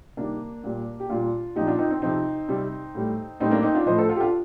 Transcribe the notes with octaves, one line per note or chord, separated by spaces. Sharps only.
C3 D#3 G3 A#3 D4
A#2 G3
G4
A#2 G3 D4 F4
A#2 F3 D#4 G4
D4 F4
C4 D#4
C4
C3 F3 C4 D#4
C3 G3
A2 G3
A2 G3 C4 D#4
A#3 D4
C4 D#4
D4 F4
A2 F3 C5 D#5
A4 C5
F4 A4
G4
D4 F4